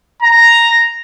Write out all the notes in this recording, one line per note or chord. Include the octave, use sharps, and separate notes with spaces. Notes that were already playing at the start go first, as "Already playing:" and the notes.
A#5